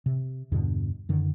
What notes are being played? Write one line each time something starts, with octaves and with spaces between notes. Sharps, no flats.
C3
E2 G2 B2 D3
F#2 D3 D#3